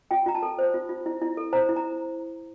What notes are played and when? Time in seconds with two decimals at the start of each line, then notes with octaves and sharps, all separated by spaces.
0.11 F4 G5
0.26 F4 A#5
0.35 A5
0.43 A4
0.59 C5
0.74 F4
0.89 F4
1.06 E4
1.22 E4
1.37 A4
1.53 C5 A#5
1.69 E4
1.76 A#5